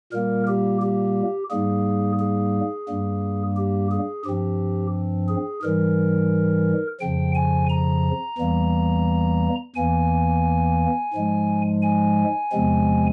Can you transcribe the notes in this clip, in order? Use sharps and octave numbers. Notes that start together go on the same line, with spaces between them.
A#2 G3 A#3 A#4
G4
G4
G#2 G3 A#3 G#4
G#4
G2 G3 A#3
G4
G#4
G2 F3 C4 G4
G#4
G#2 E3 G3 A#4
F2 C#3 F3 G5
G#5
A#5
E2 E3 G3 A#3
E2 E3 A#3 G#5
G#2 F3 G#3
G#5
E2 C3 F3 G#3 C4